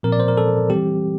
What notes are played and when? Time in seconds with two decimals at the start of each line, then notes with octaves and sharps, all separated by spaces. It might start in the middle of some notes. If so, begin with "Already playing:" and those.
0.03 A#2 F3 C4 A#4
0.12 D5
0.20 C5
0.28 A#4
0.37 A4
0.70 E3 G3 C4 G4